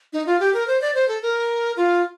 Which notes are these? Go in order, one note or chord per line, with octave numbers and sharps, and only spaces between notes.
D#4
F4
G4
A#4
C5
D5
C5
A4
A#4
F4